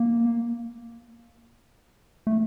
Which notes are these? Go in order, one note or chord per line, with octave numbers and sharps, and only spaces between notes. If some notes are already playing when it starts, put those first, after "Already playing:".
Already playing: A#3
A3